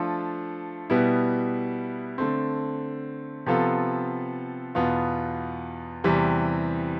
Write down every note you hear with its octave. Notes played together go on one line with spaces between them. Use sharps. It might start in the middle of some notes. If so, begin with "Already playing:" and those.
Already playing: F3 A3 D4 F4 A4
B2 G3 B3 E4
D3 A3 C4
C3 F3 B3 F4 A4
E2 B2 B3 F4
E2 C3 E3 G3 C4